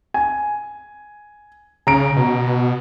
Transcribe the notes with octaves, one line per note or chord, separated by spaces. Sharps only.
G#5
C#3 A#5 D7
B2